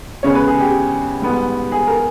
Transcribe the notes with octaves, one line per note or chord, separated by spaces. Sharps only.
C#3 G#3 B3 C#5
B4
G#4
G4
G#2 G3 B3
G#4
A#4